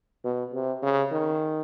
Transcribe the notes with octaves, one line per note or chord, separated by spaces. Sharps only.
B2
C3
C#3
D#3